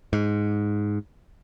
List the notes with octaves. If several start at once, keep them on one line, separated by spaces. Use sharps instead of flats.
G#2